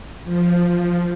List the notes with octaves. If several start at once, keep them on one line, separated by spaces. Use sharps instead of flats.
F3